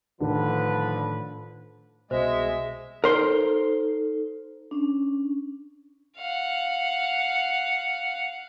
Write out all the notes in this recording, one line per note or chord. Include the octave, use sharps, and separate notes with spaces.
A2 D3 D#3 F3 D4 B4
C2 B2 G#3 C5 E5
D#4 A4 A#4 C5 C6
C#4 D4
F5 F#5